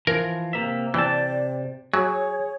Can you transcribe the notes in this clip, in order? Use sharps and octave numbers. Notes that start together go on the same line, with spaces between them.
E3 F3 A#4
C3 A#3 E5
C3 E3 D5 G5 A5
F#3 G#4 C#5